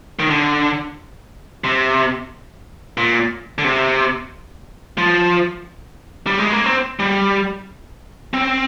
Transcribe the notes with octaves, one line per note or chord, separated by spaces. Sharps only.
D#3
D3
C3
A#2
D3
C3
F3
G3
G#3
A#3
C4
G3
C4